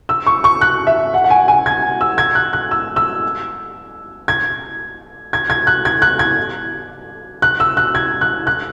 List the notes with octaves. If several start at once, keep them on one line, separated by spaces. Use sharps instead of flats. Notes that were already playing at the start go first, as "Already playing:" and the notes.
E6
C#6
C#6
F#6
E5
F#5
F#5
G#5
G#5
G#6
E6
G#6
F#6
F#6
E6
E6
G#6
G#6
G#6
F#6
G#6
F#6
G#6
F#6
E6
F#6
G#6
F#6
F#6